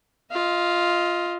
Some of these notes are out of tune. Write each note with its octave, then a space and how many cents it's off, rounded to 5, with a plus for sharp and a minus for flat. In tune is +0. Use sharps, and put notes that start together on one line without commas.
F4 +0 D#5 +30